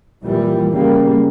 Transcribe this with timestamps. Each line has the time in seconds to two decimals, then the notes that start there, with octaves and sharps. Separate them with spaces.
0.24 A#2 E3 G3
0.73 C#3 G3 A#3